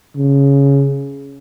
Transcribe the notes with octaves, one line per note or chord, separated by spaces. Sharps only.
C#3